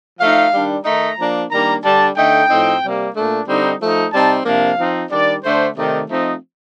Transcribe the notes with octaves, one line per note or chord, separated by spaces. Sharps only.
F3 A3 D#4 F5
D#3 G3 D4
D#3 A3 D#4 A#5
F3 A#3 D4
D#3 G3 A#3 D4 A#5
D3 G3 D4 A5
D3 A3 D#4 G5
A2 F3 C4 D#4
C3 G3 A#3
A#2 A3 D4
D3 G3 C4 D#4
F3 A3 D#4
C3 G3 C4 D#4 A5
C3 F3 A#3 D4 F5
F3 C4 D#4
D#3 G3 D4 D5
D3 A3 D4 C5
C3 D#3 A3 D#4 D5
F3 A3 C4 D#4 D#5